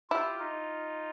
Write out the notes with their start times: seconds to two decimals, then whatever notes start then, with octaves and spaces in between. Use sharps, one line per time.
0.10 E4 F4 G4
0.39 D#4 F4